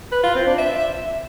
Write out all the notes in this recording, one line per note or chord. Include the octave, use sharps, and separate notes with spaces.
B4
F4
C4
D4
E5